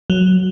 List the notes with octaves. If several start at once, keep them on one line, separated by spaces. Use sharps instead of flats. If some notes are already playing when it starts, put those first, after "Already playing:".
F#3